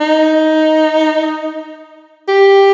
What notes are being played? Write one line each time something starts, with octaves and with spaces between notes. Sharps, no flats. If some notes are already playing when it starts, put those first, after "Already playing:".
D#4
G4